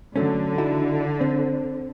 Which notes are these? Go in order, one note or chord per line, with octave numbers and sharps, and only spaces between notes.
D3 F#3 A3 C#4
D#4 E4 F#4
C4